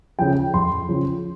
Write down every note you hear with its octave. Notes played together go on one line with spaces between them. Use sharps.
C#3 F3 G5
F2 C6
C#3 F3